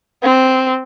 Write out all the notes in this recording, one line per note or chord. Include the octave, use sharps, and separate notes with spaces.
C4